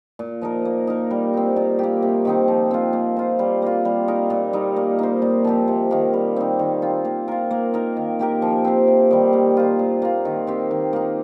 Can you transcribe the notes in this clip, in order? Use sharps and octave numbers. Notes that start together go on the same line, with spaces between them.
A#2
F3 D#4 A#4
A#3
D#4 A#4
G3
C4 D#4
A#2
A#3 G4
C3
D#3 C4 D#4
F3
C4 F4
A#3
F4 C5
G3
A#3 F4
G3
D#4 A#4
A#2
G3 D#4
A#3
D#4 C5
A#2
F3 C4 G4
C3
D#3 A#3
G3
C4 D#4
D#3
C4 F4
A#3
F4 A#4
A#3
D#4 A#4
D#3
A#3 G4 A#4
F3
C4 G4 C5
C3
D#3 G3
A#3
F4 C5
A#2
A#3 F4
D#3
C4 G4 C5
D#3
A#3 D#4